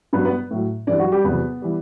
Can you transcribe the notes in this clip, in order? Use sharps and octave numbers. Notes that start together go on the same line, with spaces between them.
G2 F#3 B3 B4
B3 B4
A2 F#3
G2 E3 G3 D4 D5
F#3 F#4
G3 G4
E2 C3 F#3 B3 B4
E3 G3